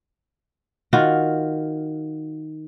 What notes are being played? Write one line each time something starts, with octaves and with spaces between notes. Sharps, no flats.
D#3 F4 F#4